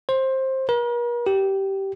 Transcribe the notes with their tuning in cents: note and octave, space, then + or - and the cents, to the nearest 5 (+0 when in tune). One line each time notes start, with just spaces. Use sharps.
C5 +15
A#4 +45
G4 -15